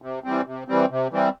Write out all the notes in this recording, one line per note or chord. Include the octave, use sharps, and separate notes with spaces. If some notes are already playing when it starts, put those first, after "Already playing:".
C3
E3 G3 C4
C3
E3 G3 C4
C3
E3 G3 C4